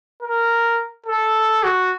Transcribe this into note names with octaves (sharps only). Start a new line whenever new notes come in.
A#4
A4
F#4